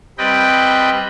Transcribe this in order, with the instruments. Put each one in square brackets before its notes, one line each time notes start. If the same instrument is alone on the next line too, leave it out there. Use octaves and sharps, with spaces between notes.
[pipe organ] G3 C4 B4 D#5 G5